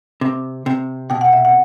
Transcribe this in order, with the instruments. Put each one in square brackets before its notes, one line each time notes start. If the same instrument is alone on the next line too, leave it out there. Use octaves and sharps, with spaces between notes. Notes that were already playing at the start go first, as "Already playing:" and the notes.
[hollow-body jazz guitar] C3
C3
[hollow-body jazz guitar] B2 [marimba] G5
[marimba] F#5
E5
F#5